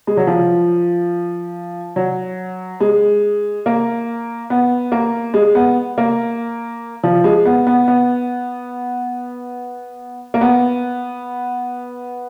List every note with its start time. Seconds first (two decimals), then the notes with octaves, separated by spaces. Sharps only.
0.07 G#3
0.17 F#3
0.27 F3
1.96 F#3
2.80 G#3
3.66 A#3
4.50 B3
4.92 A#3
5.34 G#3
5.55 B3
5.98 A#3
7.03 F3
7.24 G#3
7.45 B3
7.67 B3
7.88 B3
10.34 A#3
10.41 B3